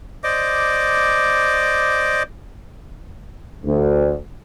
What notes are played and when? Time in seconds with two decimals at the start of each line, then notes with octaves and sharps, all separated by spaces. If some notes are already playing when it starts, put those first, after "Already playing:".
0.24 C5 D5 D#5 D6
3.64 D2